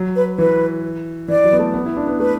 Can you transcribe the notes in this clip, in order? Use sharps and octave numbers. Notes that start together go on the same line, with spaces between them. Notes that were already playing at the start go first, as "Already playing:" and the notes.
Already playing: F#3
B4
E3 B4
E3 D5
F#3
B3
A3
B3
E4
D4
B3
A3 B4